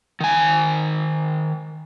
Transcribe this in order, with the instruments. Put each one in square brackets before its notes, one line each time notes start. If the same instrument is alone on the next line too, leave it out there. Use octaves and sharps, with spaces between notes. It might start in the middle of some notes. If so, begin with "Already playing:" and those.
[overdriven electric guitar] D#3 G#5